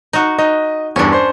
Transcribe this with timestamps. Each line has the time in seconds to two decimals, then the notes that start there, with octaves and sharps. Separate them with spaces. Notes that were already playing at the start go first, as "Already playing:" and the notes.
0.13 D#4 F#4
0.39 D#4 D#5
0.96 E2 G2 C#4 D4
1.12 C5 C6